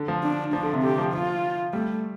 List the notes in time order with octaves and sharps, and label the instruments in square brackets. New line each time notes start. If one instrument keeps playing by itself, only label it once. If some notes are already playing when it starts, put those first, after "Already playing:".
Already playing: [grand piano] D3
F3
[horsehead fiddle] D4
[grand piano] F3 [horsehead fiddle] D4
[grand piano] D3
C3
[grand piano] D3 [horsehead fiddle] G4
[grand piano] F3
[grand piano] F3 [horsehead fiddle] F4
[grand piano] G3 [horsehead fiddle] A3